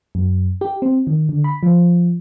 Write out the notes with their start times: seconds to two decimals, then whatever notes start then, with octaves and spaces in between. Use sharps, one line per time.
0.15 F#2
0.61 G4
0.82 C4
1.07 D#3
1.29 D3
1.44 B5
1.63 F3